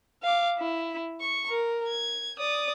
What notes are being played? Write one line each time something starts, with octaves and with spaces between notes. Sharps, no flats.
F5 D6
E4
C#6
A#4
G#6
D5 D#6